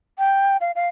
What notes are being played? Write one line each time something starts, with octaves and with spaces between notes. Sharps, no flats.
G5
F5
F5